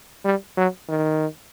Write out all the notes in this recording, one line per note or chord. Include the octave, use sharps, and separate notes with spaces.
G3
F#3
D#3